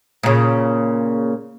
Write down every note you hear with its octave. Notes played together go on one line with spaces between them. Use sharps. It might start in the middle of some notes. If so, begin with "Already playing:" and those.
A#2 C#3